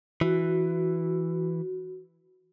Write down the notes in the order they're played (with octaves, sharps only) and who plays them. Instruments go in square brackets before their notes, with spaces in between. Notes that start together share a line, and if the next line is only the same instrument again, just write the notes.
[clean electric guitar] E3 [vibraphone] F#4